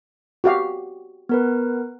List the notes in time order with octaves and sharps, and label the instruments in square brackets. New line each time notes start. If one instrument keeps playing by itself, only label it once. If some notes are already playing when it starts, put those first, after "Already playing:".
[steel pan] F#4 G4 F5
[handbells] B3 A#4 B4